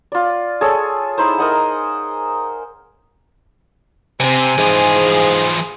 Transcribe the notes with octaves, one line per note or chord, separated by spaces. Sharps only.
F4 D5
G#4 A4 C#5
D#4 E4 C5
A#4 D#5 F#5
C3 C4 G#5
G#2 E3 F3 G#4 F5